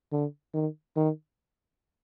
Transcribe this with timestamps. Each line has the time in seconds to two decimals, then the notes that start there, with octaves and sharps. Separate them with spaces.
0.12 D3
0.54 D#3
0.97 D#3